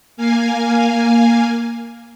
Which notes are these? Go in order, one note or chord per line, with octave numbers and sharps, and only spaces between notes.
A#3 F5 G#5